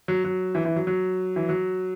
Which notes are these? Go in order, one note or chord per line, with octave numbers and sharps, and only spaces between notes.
F#3
F#3
E3
E3
F#3
F#3
E3
F#3